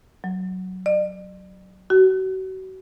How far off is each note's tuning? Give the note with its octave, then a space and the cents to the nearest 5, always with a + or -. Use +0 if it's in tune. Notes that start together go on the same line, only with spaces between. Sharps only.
F#3 +5
D5 +40
F#4 +35